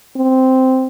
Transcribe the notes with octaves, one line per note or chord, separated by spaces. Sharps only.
C4